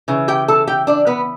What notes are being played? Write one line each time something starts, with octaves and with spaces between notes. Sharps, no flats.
C#3 E3
G4 G5
A4 A5
G4 G5
D4 D5
B3 B4